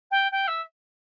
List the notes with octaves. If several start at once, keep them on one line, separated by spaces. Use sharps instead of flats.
G5
G5
E5